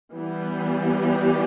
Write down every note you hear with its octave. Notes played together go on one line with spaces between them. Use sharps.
E3 G3 B3
G4